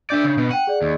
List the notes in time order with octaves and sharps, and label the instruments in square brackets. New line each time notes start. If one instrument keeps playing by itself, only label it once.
[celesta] D4 G6 [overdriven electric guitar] D5 E5
[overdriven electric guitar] C#3
B2
[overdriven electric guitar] F#5 [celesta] G5 D#7
[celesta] G#4 D5
[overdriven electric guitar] D#2